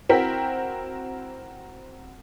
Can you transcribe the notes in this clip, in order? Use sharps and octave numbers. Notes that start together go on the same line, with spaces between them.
C4 E4 F#4 A#4 G5 B6